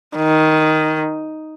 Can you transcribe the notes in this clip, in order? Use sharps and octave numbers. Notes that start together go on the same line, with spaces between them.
D#3